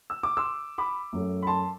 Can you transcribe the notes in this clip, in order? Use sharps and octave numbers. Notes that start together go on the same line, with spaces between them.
E6
D6
C6 E6
B5 D6
F#2 F#3 A3
B5
A5 C6